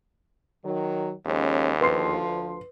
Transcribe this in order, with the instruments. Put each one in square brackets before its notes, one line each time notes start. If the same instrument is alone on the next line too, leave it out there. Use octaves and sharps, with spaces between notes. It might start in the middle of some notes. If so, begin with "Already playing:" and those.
[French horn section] D#3 F#3
[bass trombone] D#2 [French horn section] F3 G#3 C#4
[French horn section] D2 F3 [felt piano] B4 C6 C7